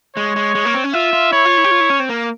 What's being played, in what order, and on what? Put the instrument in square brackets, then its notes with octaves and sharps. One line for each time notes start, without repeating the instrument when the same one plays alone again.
[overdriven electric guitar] G#3 [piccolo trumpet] C#5
[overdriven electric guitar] G#3
G#3
A#3
C4
C#4
[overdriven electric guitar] F4 [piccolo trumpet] E5
[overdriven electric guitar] F4
[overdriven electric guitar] E4 [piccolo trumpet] C#5
[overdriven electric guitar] F4
E4
G4
F4
E4
C#4
C4
A#3